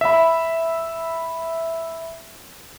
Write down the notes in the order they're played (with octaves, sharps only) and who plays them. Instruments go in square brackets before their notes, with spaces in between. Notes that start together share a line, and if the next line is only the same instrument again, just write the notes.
[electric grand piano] E5 B5